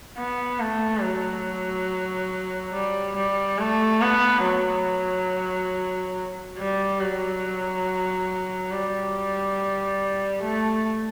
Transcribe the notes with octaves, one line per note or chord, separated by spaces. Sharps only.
B3
A3
F#3
G3
G3
A3
B3
F#3
G3
F#3
G3
A3